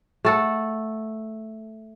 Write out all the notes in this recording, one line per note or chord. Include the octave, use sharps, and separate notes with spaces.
A3 A4 F#5